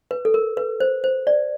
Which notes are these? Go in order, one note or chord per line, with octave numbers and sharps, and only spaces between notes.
B4
A4
A#4
B4
C5
C5
D5